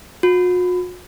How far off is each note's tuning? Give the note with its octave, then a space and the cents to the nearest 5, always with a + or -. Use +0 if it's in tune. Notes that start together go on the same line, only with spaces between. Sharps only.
F#4 -45